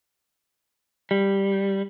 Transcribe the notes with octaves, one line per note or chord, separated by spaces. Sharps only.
G3